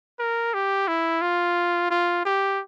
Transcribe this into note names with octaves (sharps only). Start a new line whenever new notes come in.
A#4
G4
E4
F4
F4
G4